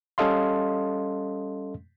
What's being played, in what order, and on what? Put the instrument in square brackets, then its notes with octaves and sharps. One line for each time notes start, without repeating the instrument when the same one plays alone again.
[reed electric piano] G3 C#4 A4 D#5 F5 C6